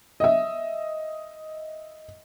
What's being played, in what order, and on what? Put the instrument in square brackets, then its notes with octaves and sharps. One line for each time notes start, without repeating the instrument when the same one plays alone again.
[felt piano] D#5 E5